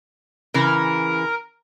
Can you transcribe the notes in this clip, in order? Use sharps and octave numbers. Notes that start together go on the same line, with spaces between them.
C#3 E3 A#4